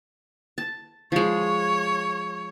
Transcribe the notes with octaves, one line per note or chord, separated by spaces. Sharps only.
A5
F3 G#3 C#5